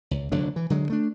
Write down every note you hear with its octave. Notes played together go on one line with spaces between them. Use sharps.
C#2
F1 D3 F#3 D4
E3
D3 F#3 G#3
A3 D4